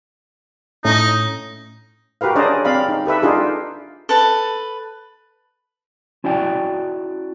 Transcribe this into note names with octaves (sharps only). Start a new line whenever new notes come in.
A2 A3 C#4 D#4
F#4 G4 A#4 B4 F5
C#4 D4 G#4 C5 D5 D#5
C4 D5 F5 B5
D#4
G4 A4 B4 E5
D4 D#4 F4 G4 G#4
A4 B4 A5
C#4 E4 F#4 D5 G5